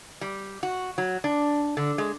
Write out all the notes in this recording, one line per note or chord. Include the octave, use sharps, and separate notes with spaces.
G3
F#4
F#3
D4
D3
G#3